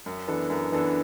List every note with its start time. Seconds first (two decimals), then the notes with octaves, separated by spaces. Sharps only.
0.06 F#2
0.28 E3 B3 D4 A4
0.50 F#2
0.72 E3 B3 D4 A4